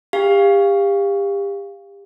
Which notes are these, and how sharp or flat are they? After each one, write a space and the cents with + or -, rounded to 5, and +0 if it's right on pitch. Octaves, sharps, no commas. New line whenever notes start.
G4 +30 F5 +0